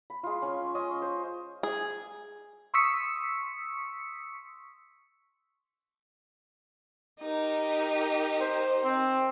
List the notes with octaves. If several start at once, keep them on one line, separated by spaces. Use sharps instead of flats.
B5
G#3 F4
C#4 C#5
C#4 D#5
C5
G#4
C6 C#6 D#6 E6 B6 C#7
D#4 G4 A#4
C5
C4